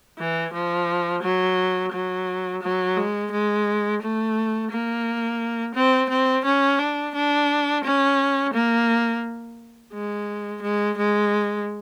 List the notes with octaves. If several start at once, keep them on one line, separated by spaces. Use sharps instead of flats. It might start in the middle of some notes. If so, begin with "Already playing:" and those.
E3
F3
F#3
F#3
F#3
G#3
G#3
A3
A#3
C4
C4
C#4
D4
D4
C#4
A#3
G#3
G#3
G#3